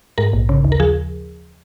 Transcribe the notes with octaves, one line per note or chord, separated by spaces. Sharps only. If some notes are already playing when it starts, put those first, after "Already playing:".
G#2 A#4
A#1
C#3
D#2
A#4
F3 G#4